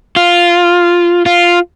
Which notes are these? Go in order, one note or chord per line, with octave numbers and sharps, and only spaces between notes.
F4
F4